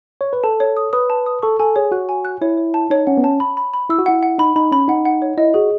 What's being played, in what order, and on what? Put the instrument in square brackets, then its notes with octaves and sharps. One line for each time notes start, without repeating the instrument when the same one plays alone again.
[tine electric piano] C#5
B4
[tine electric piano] A4 [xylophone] A5
[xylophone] C#5
D#6
[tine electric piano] B4 [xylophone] D#6
[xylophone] A5
D#6
[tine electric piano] A4 [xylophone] C#6
[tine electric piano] A4 [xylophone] G#5
[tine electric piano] G#4 [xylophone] C#5
[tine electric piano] F#4 [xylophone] F#6
[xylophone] G#5
F#6
[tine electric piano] E4 [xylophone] C#5
[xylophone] C#5
A5
[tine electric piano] D#4 [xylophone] C#5
[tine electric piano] C#4 [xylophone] F#5
[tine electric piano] B3
[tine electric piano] C#4 [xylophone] A5
[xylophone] B5
B5
B5
[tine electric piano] E4 [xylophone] E6
[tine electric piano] F#4
[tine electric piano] E4 [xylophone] F#5
[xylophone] F#5
[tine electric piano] D#4 [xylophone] B5
[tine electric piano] D#4 [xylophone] B5
[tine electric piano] C#4 [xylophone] B5
[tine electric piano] D#4 [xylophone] F#5
[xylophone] F#5
C#5
[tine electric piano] E4 [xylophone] D#5
[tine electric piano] F#4 [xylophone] G#4